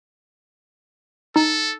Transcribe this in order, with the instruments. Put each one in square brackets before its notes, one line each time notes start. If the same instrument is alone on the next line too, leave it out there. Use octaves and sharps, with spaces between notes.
[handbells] D#4 [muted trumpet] A4